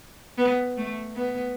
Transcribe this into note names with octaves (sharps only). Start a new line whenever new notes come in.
B3
A3
B3